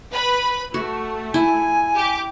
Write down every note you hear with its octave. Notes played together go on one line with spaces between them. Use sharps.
B4 B5
A3 F#4
E4 G#5
G4 D6